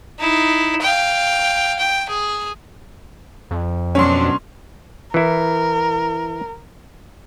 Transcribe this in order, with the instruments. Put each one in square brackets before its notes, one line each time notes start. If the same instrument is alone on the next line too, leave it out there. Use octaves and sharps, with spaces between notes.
[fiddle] D#4 E4
F5 G5
G5
G#4
[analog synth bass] F2
[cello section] B2 F#3 D4 [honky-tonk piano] C#4 C6
[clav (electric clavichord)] E3 E4 [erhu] A#4